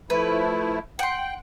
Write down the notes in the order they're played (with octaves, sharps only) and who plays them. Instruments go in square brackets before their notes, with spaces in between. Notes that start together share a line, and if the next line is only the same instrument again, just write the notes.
[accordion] F3 A3 E4 [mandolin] B4
[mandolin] F#5 C6 [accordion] G5